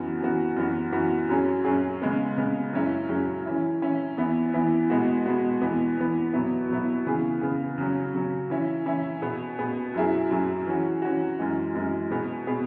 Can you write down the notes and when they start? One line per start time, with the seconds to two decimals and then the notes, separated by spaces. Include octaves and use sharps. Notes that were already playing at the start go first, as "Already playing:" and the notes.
Already playing: F#2 E3 B3 F#4
0.20 F#2 E3 B3 F#4
0.56 F#2 E3 B3 F#4
0.92 F#2 E3 B3 F#4
1.29 F#2 F#3 C#4 G#4
1.65 F#2 F#3 C#4 G#4
2.02 C#3 G#3 B3
2.37 C#3 G#3 B3
2.73 F#2 F#3 C#4 E4 G#4
3.09 F#2 F#3 C#4 E4 G#4
3.46 E3 C#4 E4
3.82 E3 C#4 E4
4.17 E2 E3 B3 E4
4.54 E2 E3 B3 E4
4.90 B2 G#3 B3 F#4
5.26 B2 G#3 B3 F#4
5.61 E2 E3 B3
5.98 E2 E3 B3
6.33 B2 F#3 B3 E4
6.69 B2 F#3 B3 E4
7.06 C#3 E3 B3 G#4
7.41 C#3 E3 B3 G#4
7.78 C#3 F#3 C#4
8.14 C#3 F#3 C#4
8.50 E3 C#4 E4
8.86 E3 C#4 E4
9.22 B2 B3 G#4
9.59 B2 B3 G#4
9.94 F#2 F#3 E4 G#4
10.30 F#2 F#3 E4 G#4
10.67 E3 C#4 F#4
11.02 E3 C#4 F#4
11.39 F#2 E3 G#3
11.75 F#2 E3 G#3
12.11 B2 B3 G#4
12.47 B2 B3 G#4